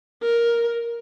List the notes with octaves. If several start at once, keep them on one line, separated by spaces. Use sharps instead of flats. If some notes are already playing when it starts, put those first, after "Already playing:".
A#4